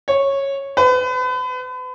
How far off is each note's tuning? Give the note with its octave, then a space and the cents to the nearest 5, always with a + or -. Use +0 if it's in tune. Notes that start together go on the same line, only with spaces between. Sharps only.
C#5 -10
B4 +35